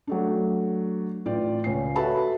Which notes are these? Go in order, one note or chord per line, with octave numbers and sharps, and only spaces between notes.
F#3 A3 D4
A1 F4 D5 G5
C#2 C#4 C7
F#4 A4 B4 E5 A5 B5